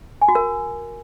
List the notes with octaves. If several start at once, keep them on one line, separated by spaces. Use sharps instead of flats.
G#5
F#4
A#4